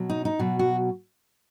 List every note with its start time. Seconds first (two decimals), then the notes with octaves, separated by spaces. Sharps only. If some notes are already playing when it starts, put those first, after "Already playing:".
Already playing: B2 F#3
0.10 D#4
0.25 D#4
0.39 B2 F#3 F#4
0.59 F#4